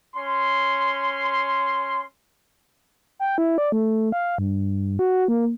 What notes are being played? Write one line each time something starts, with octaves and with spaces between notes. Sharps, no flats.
C#4 C6
G5
E4
D5
A3
F5
G2
F#4
A#3